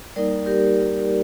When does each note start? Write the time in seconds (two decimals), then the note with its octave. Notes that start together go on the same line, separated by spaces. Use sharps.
0.16 G3 A#3 D#4 A#4 D5
0.46 G4 A#4